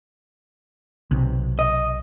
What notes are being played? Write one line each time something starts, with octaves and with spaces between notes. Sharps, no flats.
B1 C3
D#5